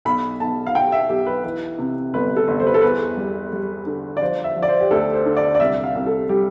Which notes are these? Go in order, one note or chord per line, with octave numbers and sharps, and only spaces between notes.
B1 B5
B1 A5
F5
B2 G5
E5
B1 G4
B4
E3 B4
C3
G1 B4
A4
G1
C5
B4
A4
E2 B4
G3
G3
D3
D5
F3 C5
E5
F3
D5
C5
G4
D2 A4
C5
D3
D5
D5
C2 E5
F5
C2
A4
G3 G4